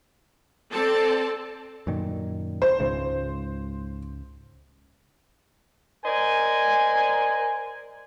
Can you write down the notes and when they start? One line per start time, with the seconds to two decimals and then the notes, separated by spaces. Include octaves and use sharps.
0.71 C4 A4 D5 A5
1.87 F#2 A#2 D#3
2.62 C5
2.80 C#2 G#2 C#3
6.05 A#4 C5 D5 D#5 G#5